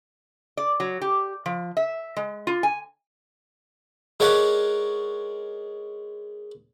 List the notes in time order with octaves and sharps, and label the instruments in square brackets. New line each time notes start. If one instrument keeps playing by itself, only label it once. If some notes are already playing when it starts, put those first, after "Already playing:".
[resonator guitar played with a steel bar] D5
F#3
G4
F3
E5
G#3
F4
G#5
[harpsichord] G#3 A#4 C#5 D5 F#5